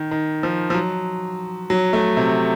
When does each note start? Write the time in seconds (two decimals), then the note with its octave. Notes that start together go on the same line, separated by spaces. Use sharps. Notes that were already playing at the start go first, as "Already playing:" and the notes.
Already playing: D#3
0.11 D#3
0.43 F3
0.70 F3
0.74 F#3
1.70 F#3
1.93 A3
2.17 C3